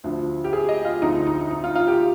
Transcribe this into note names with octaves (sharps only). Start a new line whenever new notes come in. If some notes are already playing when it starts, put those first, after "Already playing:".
D2 D3 F3
G4
G#4
D#5
F4
D2 D3 F3 D#4
D#4
D#4
F4
F4
G4